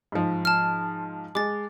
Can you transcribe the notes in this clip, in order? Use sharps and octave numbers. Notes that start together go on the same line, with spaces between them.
G#2 F3
A5 F6
G#3 D6 A6